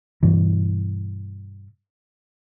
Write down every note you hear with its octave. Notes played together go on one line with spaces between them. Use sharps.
G2 B2 E3